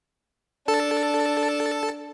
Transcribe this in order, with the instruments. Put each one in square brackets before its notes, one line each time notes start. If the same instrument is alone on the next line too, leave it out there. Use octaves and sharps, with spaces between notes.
[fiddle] D4 [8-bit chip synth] A4 A5